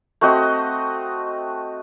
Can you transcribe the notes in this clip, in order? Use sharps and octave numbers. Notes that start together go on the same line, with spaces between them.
A3 C4 F#4 D#5